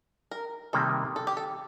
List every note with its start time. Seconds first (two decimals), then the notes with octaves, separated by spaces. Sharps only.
0.31 A#4
0.73 C3 D#3 G3 A#3 A4
1.16 A4
1.27 G4
1.37 A4